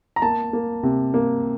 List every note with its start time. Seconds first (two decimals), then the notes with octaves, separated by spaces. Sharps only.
0.16 A#5
0.22 A#3 A5
0.53 A#3
0.83 C3
1.14 A#3